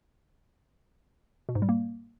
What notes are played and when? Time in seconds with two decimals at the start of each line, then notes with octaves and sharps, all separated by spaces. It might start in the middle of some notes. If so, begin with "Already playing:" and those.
1.49 B2
1.55 G#2
1.62 G3
1.69 A#3